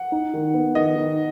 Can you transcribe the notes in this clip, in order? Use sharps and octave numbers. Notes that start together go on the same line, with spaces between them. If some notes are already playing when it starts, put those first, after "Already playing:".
Already playing: F#5
D#4
D#3
B3
D#3 D#5
D#3